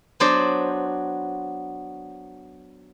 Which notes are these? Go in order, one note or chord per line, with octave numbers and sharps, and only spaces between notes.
F#3 B3 D4 C5 D5